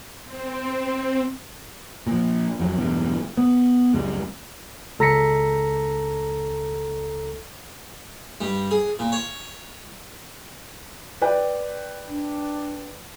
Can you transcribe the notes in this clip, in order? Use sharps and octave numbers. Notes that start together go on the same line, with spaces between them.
C4
A#2 F3
F2 F3 F#3
B1 E2 G2
B3
C#2 F#2 G3 G#3
C#2 A4 A#5 A#6 B6 C#7
G2
G#4
A#2
C#5
B4 D5 G5
D4